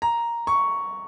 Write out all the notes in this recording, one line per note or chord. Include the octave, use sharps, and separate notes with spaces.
A#5
C#6